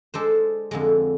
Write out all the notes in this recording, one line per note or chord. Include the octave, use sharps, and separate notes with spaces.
G#3 D4 A4 C5
F2 D3 G#3